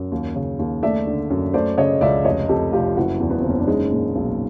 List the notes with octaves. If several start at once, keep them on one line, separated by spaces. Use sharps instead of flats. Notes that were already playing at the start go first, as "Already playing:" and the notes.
Already playing: F#2
D#2
C#3
D#2
A3 D5 E5
D3
F#2
A3 C5 D5
C#3 C#5 D#5
C#2 D5 E5
F1 C#5 D#5
F2 G4 A4
F1 F4 G4
F#1 E4 F#4
E2
B3
F#1 C4
C#4
D4
G#3 C#4 D#4
A#2
B1